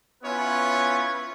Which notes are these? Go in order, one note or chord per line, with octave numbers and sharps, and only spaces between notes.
B3 C#4 E4 F4 B4 C#5